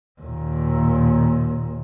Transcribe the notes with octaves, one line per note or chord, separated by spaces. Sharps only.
D#2 A#2